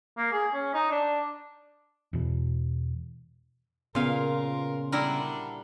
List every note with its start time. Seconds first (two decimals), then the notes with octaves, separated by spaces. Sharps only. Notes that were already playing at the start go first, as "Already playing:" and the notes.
0.17 A#3
0.32 G#4
0.54 C#4
0.74 D#4
0.91 D4
2.13 E2 B2
3.95 A#2 C#3 B3 F4 A#4 F5 C6
4.92 D3 G3 D4 E4 A#4